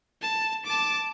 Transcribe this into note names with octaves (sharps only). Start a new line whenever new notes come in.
A5
A5 D6